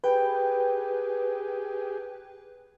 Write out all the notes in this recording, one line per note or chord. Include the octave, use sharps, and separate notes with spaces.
G4 G#4 B4 G5